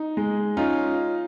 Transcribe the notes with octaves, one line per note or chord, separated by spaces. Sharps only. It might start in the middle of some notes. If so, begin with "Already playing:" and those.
Already playing: D#4
G#3
C#4 D#4 F4